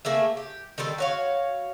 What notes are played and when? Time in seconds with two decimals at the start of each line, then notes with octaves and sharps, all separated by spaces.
0.05 A3 A#3 G#4 E5
0.37 G4
0.78 D#3 G3 C4 A4
0.98 F#4 C#5 F5